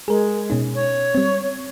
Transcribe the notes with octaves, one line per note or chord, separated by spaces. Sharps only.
G#3 G#4 A#4
B2 C#4 D#4
C#5
G3 C4